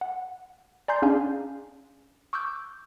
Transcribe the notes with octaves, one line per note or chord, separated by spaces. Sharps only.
F#5
D5 G#5 A#5 C6 G6 C7
C#4 D4 G#4 F5 G#5
C#6 D6 E6 F#6 G6